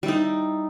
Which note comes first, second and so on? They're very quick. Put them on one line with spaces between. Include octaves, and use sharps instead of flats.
G3 E4 D#4